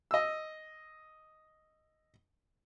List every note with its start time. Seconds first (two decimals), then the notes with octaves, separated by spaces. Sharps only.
0.11 D#5 E6